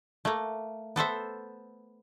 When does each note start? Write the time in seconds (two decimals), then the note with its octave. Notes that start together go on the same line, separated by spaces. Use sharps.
0.25 A3 A#3
0.96 B3 A4 C5 E5